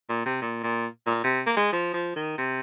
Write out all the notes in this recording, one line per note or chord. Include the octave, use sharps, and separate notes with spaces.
A#2
C3
A#2
A#2
A#2
C3
A#3
G#3
F3
F3
D#3
C3